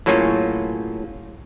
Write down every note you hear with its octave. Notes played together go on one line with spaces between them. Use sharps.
A2 F#3 A#3 C#4 F4 G#4